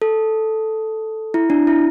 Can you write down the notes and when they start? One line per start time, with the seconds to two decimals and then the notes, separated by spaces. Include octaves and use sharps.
0.02 A4
1.34 E4
1.50 D4
1.67 E4